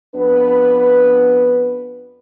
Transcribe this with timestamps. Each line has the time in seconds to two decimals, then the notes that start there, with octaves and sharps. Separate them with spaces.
0.15 F2 B3 D4 B4